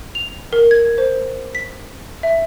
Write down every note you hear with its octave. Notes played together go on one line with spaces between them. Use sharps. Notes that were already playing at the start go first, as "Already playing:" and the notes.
F7
A#4
G#6
C5
B6
E5